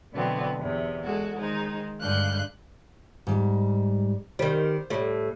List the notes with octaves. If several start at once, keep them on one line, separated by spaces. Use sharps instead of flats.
B2 D3 E3 F#3 B3 C4
E2 C3
G#3 F#4 A4
D#3 G#3 D#4 C5
G2 D3 G#3 F5 F#6 G6
G#2 G3
D#3 G3 C5
A2 G3